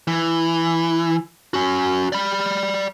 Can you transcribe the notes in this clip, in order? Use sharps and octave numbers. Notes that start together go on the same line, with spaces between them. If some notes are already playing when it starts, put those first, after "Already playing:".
E3
C#4 F#4
D5 B5